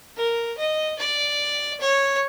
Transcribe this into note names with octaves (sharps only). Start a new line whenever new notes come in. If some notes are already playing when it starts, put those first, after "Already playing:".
A#4
D#5
D5
C#5